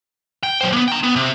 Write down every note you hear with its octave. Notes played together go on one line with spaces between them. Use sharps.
G5
F#3 C5
A#3 B3
G5 A#5
B3
C3